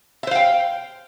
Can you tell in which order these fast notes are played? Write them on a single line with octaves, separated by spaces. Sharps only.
E5 C5 F5 G5